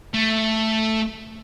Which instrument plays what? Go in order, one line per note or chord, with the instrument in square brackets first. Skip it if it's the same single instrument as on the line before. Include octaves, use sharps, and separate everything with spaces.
[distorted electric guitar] A3